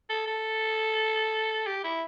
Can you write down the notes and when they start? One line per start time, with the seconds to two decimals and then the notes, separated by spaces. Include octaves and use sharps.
0.10 A4
0.27 A4
1.66 G4
1.84 E4